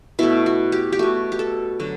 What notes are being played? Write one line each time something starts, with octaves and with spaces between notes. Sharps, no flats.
B2 A3 E4
F#4
G4
G4
B2 A3 F#4
G4
A4
D3 F#3